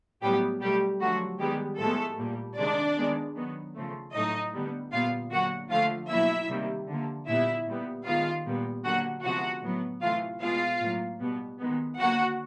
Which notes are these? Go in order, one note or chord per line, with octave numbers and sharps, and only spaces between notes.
A2 F#3 G3 B3 G4
B2 F#3 G3 A3 G4
D3 F3 F#3 A3 F#4
D#3 G3 G#3 B3 G4
A2 F3 G#3 A3 B3 A4
A#2 G3 A#3
C3 D#3 G#3 D4 D5
D#3 G#3 B3
D#3 F#3 B3
C#3 F3 A3
A2 F#3 A3 D#4 D#5
D3 G3 B3
A#2 G3 B3 F4 F5
D3 F#3 A#3 F#4 F#5
D3 F3 A3 F4 F5
B2 F#3 A#3 E4 E5
C3 D#3 G3 A#3
D3 F3 A#3
A#2 G3 B3 E4 E5
A#2 G3 B3
D#3 G#3 B3 F4 F5
A#2 G3 B3
D3 F#3 A#3 F#4 F#5
C3 F3 G#3 B3 F#4 F#5
A2 F#3 B3
C3 E3 A3 F4 F5
B2 G#3 B3 F4 F5
A2 F#3 A#3
B2 G3 B3
D#3 G#3 B3
D3 F#3 A#3 F#4 F#5